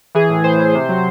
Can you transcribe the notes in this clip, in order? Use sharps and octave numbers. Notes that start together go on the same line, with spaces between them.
E3 G#4
A2
A2 C5
E3
C3
F#3